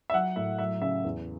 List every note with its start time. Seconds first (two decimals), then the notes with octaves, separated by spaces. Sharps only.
0.10 E5
0.13 F#3 F#5
0.36 A2 E5
0.59 F#3 E5
0.82 C#3 E5
1.04 E2